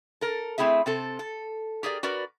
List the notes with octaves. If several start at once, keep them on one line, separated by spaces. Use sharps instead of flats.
A4 A#4
A3 C4 E4 G#4 E5
C3 C4 A4
A4
G4 G#4 A#4 D5
F#4 A#4 B4 D5